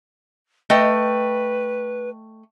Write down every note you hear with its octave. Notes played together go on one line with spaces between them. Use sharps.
A3 B4 D#5 G5